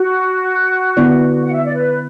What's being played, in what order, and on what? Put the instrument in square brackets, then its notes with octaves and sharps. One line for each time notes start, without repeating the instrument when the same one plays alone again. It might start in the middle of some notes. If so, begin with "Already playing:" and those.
Already playing: [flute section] F#4
[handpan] D3 B3 E4 D5
[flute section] F#5
E5
D5
B4